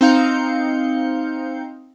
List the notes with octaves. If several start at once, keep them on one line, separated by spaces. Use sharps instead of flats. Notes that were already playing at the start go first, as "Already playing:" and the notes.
C4 D#4 F5 G6 C#7